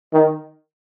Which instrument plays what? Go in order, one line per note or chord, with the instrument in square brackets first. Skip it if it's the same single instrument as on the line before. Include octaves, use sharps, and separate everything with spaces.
[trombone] D#3